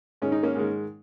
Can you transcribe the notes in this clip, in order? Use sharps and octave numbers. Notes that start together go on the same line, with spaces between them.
G#2 D#3 G#3 C#4
D#4
A#3 C#4
G#2 D#3 G#3